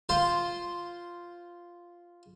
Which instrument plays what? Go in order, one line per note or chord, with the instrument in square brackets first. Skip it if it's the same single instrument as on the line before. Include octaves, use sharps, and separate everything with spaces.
[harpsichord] F4 C5 C6